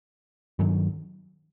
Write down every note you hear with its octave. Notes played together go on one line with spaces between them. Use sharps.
G2 D#3 F#3